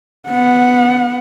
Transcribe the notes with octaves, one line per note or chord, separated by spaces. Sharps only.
B3 F#5